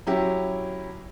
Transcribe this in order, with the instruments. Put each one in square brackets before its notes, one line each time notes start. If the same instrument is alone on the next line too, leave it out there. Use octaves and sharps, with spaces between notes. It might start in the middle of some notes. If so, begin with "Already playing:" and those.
[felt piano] F#3 C#4 E4 G4